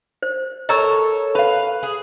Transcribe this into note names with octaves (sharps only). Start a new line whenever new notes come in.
C5
A4 A#4 C#5 D#5 A#5 E6
B4 F5 B5
G#4